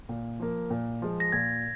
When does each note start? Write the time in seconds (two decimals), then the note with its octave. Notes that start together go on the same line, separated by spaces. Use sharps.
0.09 A#2
0.40 F3 A#3
0.70 A#2
1.02 F3 G#3
1.20 A#6
1.32 A#2 G#6